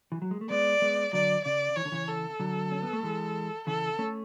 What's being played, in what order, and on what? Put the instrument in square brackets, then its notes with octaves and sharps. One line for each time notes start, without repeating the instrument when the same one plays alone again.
[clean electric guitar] E3
F#3
G#3
A3
[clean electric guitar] G#3 B3 [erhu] D5
[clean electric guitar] G#3 B3
[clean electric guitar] D3 F#3 [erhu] D5
[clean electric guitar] C#3 [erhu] D5
[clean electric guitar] E3 [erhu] C#5
[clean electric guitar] D3
C#3 E3
[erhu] A4
[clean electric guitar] D3 F#3
C#4
B3
A3
E3 G#3
[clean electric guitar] C#3 E3 [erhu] A4
[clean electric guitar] A3 C#4